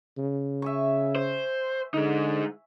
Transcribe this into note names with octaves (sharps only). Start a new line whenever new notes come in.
C#3
E5 G#5 C#6
C5
D3 G#3 D#4